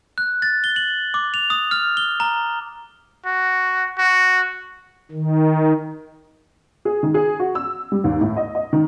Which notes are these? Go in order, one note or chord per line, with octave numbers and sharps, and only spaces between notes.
F#6
A6
G7
F#7
D6
F7
D#6
F6
G7
A#5
F#4
F#4
D#3
G#4
D#3
G#4
F#4
E6
G3
D#2
A2
D#5
D#5
D#3